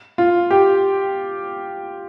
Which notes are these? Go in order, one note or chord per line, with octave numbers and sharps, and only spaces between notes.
F4
G4